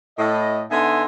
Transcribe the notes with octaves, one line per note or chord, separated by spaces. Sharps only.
A2 D#5
D3 B3 D#4 E5 G#5 C6